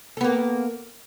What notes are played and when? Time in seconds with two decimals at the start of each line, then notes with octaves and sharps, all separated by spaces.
0.17 A4
0.21 B3
0.24 A#3